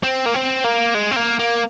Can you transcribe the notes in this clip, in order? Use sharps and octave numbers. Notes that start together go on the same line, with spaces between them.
C4
A#3
C4
A#3
G#3
C4
A#3
A#3